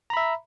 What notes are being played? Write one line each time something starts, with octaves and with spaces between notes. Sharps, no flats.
E5 A#5 B5